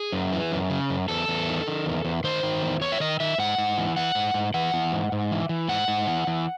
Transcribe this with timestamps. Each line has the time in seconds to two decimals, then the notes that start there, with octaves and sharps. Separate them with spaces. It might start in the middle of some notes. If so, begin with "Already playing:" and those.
Already playing: G#4
0.12 F#2
0.33 E3
0.52 F#2
0.70 C#3
0.90 F#2
1.08 E2 A4
1.28 E2
1.48 D#3
1.67 D#3
1.86 E2
2.05 E2
2.24 D#3 C5
2.43 D#3
2.62 E2
2.81 E2 C#5
2.92 E5
3.00 D#3 D#5
3.20 D#3 E5
3.38 G#2 F#5
3.58 G#2
3.78 E3
3.97 E3 F#5
4.15 G#2
4.34 G#2
4.54 E3 F#5
4.73 E3
4.92 G#2
5.12 G#2
5.31 E3
5.49 E3
5.69 G#2 F#5
5.88 G#2
6.07 E3
6.27 E3